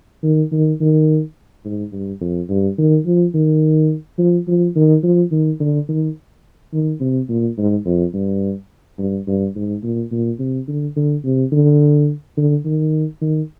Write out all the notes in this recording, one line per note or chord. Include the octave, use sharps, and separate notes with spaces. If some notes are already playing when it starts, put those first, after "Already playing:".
D#3
D#3
D#3
G#2
G2
F2
G2
D#3
F3
D#3
F3
F3
D#3
F3
D#3
D3
D#3
D#3
C3
A#2
G#2
F2
G2
G2
G2
G#2
A#2
A#2
C3
D3
D3
C3
D3
D3
D#3
D#3